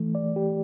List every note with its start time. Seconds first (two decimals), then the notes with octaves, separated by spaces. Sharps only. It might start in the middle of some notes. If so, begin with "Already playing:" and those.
Already playing: E3 A3
0.15 D5
0.36 G4